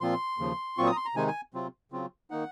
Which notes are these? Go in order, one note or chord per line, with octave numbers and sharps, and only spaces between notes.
A#2 F3 C4 F4 C6
D#2 C#3 F3
A#2 F#3 C4 F4 C#6
D#6
A#5
C6
A#5
C3 D#3 G#3 D#4 G#5
G#5
C3 F#3 C4 F4
C#3 F#3 C4 F4
D#3 A#3 D#4 F#5